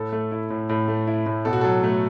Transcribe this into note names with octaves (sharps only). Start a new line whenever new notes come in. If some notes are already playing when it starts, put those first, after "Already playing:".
Already playing: A2 A4
A3
E4
A2
A2
A3
E4
A2
B2 A4
F#4
F#3 A4
A3